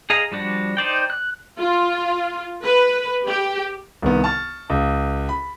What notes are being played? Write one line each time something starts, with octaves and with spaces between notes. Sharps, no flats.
G#4 D#5 F5 A#5
F3 G3 D4 F#4
D#4 C5 D5 G5
F#6
F4
B4
G4
C2 D#3 B3
A5 C#6 F6 A6
C#2
B5